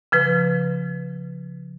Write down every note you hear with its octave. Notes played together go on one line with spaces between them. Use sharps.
C#3 F3 B4